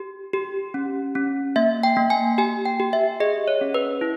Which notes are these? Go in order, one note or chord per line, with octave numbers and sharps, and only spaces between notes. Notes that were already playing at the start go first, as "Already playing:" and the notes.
Already playing: G4
G4
C#4
C#4
A#3 E5
G5
A#3
G#5
G4 G#5
G5
G4
E5
G#4 D#5
C#5
C#4
B4
E4